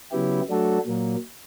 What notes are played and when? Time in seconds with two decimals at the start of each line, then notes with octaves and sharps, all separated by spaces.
0.11 C#3 F#3 B3 E4 G4
0.48 F#3 A3 D4 F#4 A4
0.86 A#2 F#3 A#3